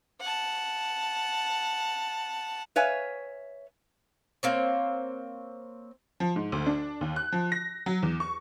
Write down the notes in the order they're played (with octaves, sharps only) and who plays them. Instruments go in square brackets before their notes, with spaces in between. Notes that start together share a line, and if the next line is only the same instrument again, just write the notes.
[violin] F#5 A5
[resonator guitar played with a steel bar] B4 C#5 E5 F5 G#5
[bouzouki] A#3 C4 C#5
[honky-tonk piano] F3
G#2
D2
D4
D#2
F#6
F3
A#6
F#3
E2
C#6